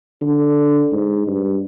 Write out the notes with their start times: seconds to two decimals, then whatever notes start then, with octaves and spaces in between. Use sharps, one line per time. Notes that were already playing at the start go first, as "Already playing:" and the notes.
0.21 D3
0.92 G#2
1.27 G2